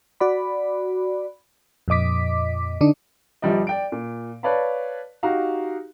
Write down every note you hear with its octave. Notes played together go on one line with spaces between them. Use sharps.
F#4 D5 B5
F2 A#2 D#5 D6 B6
D3 D4 D#4
G1 F3 G3 D5 D#5
D5 G5 D7
A#2
B4 C#5 D5 F5 A5 B5
D#4 F#4 G4 F5 A#5